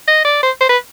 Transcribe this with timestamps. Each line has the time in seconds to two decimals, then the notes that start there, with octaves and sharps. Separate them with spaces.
0.08 D#5
0.25 D5
0.43 C5
0.61 C5
0.69 B4